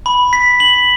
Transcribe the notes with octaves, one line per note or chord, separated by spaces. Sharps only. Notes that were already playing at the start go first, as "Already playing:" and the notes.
B5
B6
F#7